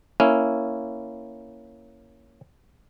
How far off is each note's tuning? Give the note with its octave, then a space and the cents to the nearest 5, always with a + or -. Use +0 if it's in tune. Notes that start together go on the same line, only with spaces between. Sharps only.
A#3 +0 C#4 +0 E4 +0